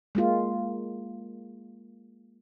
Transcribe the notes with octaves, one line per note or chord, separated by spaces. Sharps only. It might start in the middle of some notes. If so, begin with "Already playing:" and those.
G#3 A#3 F4